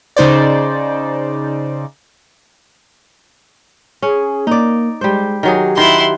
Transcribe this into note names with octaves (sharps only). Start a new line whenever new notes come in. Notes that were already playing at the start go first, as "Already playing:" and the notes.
C#3 D#4 C5 D5
C#4 G#4
A#3 D#4 D5
G3 G#3 C5
D#3 F#3 G4 G#4
D#3 E4 B4 C6